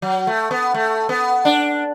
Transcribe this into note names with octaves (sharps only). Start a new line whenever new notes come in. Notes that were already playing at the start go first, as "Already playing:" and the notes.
F#3
A3
B3
A3
B3
D4